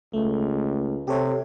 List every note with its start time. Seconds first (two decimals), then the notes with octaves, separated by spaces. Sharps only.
0.13 C#2 A3
1.08 C3 G4 A4 C#5